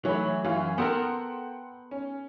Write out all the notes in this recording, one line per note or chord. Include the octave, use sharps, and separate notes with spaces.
E3 F#3 A3 B5
F#2 E3 F4
B3 A4 A#4 F#5 G5 C6
C#4